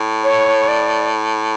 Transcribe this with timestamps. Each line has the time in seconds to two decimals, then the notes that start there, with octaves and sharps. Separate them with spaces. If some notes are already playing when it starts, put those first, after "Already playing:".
Already playing: A2
0.24 C#5
0.68 D5